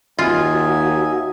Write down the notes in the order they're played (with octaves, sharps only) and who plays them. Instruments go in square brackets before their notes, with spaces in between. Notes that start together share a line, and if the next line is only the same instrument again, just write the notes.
[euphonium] D#2 [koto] F4 [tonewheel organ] F#4 [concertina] D#5 E5 G#5